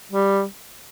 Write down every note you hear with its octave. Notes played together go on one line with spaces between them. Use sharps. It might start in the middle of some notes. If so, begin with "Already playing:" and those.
G3